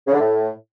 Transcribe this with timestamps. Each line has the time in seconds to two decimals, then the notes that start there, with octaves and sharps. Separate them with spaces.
0.07 C#3
0.13 D3
0.20 A2